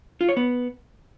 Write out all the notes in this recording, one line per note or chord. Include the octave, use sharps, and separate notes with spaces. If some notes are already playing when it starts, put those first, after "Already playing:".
F4
C#5
B3